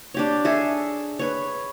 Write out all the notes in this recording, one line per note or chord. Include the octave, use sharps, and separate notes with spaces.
D4 G4 C#5
G#4 A4 E5
B4 C#5